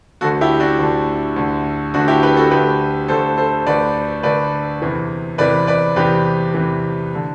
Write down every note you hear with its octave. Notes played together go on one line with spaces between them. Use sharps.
D2 D3 F#4 A4
E4 G4
D4 F#4
D2 D3
D2 D3
D2 D3 D4 F#4
E4 G4
G4 B4
F#4 A4
D2 D3 G4 B4
D2 D3 A4 C5
A4 C5
D2 D3 B4 D5
D2 D3 B4 D5
E2 C3 E3
E2 C3 E3 B4 D5
B4 D5
E2 C3 E3 G4 B4
E2 C3 E3
D3